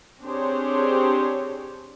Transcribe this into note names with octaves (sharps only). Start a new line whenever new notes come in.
C4 D4 G4 G#4 C5 C#5